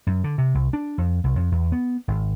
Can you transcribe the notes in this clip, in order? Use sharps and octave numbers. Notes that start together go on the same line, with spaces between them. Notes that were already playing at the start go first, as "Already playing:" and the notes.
F#2
D3
C3
C2
D4
F2
C2
F2
E2
B3
G#1